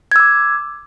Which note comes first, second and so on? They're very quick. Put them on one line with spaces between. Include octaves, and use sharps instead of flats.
G#6 E6 D6